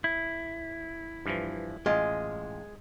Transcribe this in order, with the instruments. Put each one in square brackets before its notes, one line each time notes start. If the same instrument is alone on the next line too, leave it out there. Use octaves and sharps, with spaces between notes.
[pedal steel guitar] E4
[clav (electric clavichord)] G2 E3 F3
[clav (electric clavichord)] A1 F4 [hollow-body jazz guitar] G#3